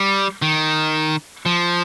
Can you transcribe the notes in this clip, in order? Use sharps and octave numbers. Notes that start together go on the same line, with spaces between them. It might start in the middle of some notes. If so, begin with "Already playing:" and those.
Already playing: G3
D#3
F3